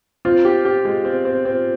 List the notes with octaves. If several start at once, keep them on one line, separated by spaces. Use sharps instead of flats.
C4 F4
G4
G4
G#3
C4
C4
C4